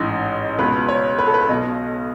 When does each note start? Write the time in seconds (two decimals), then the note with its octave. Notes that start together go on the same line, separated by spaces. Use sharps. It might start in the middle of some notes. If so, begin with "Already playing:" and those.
Already playing: A1 G#2 E3 D#4
0.59 C#2 B2 B4
0.89 C#5
1.19 B4
1.27 A4
1.34 B4
1.49 B1 B2 D#5